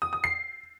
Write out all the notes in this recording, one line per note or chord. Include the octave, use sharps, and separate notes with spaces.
D#6
D#6
C7